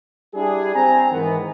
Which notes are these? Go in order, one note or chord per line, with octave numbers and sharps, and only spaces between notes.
G3 D4 E4 G4 G#4
C4 G#5 A#5
G#2 D#3 E3 B3